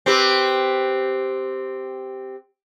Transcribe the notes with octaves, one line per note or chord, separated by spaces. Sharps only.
C4 G4 B4